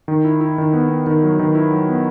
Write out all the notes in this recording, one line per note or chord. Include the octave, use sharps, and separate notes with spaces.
D#3
E4
E4
D#3
B3
B3
D#3
F#3
D#3
E4
F#3
B3